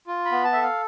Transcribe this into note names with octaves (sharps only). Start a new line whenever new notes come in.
F4
B5
B3
A5
A4 E5
F5